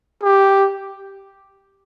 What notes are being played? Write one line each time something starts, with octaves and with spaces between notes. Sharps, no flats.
G4